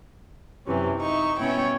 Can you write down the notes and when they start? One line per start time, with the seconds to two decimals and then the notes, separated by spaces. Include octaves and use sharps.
0.67 F#2 C3 E3 C#4
0.99 D#4 E5 C#6
1.40 B2 B3 C#4 E4 C#5 G5